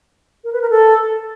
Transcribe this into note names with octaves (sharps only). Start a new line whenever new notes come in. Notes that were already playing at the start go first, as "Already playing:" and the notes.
A#4
B4
A#4
A4